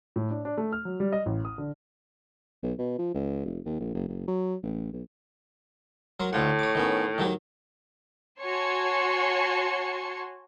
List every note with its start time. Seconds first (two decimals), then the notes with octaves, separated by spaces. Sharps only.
0.16 A2
0.30 D4
0.45 D4
0.57 A3
0.72 F6
0.85 F#3
1.00 G3
1.13 D#5
1.26 A1
1.45 D#6
1.58 D3
2.63 B1
2.78 B2
2.99 F3
3.14 C#2
3.45 F1
3.66 D#2
3.80 A#1
3.94 F#1
4.08 F#1
4.27 F#3
4.63 A1
4.93 B1
6.20 F#3 A#4 C6
6.33 D2 A2 F4 F#5
6.59 C#5 D6
6.75 D#3 B3 C#4
7.18 D#3 F#3 G4
8.42 F#4 C#5 G#5 A5 C6 C#7